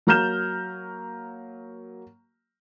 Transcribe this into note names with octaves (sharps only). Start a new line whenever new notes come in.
F#3 A#3 A#5 F6 G6 E7